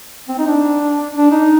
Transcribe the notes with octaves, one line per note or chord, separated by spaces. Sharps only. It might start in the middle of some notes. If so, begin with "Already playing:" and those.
C4
D#4
D4
D4
D#4